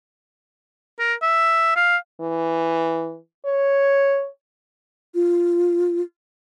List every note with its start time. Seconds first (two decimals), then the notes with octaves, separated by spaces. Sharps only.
0.99 A#4
1.22 E5
1.76 F5
2.21 E3
3.45 C#5
5.15 F4